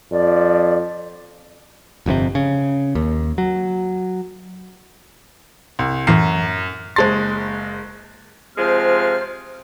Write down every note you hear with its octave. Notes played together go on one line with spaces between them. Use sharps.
F2 D5
G1 F2 G#2 C3
C#3
D#2
F#3
C2
F#2 A2 E3 C7
F#1 G#3 C5 A5 C6 A6
C3 F3 G#3 C5 F6